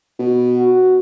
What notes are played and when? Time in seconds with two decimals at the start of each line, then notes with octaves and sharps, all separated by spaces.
0.19 B2
0.57 F#4